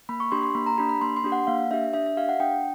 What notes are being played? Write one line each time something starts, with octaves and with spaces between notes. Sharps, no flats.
A#3 B5
C#6
D4 G4 C6
C6
A#3 B5
A#5
D4 G4 B5
B5
A#3 C6
C6
D4 G4
F#5
A#3 F5
D4 G4 E5
D4 E5
E5
G4 F5
F#5
D4 G5